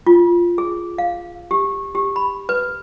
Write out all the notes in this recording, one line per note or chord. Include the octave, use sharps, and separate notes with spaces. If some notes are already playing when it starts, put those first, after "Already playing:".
F4
G#4
F5
G4
G4
B5
B4